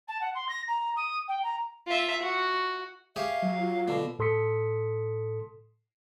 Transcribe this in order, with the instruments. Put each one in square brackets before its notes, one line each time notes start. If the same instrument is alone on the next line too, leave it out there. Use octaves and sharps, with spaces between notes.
[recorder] A5
F#5
C6
A#6
A#5
D#6
G5
A#5
[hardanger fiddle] F4 E5
F#4
[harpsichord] G4 G#4 C#5 [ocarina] E5 [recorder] F5
[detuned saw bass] F#3
[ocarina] F4
[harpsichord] B2 D3
[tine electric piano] A2 A4 C6 D#6 B6 C#7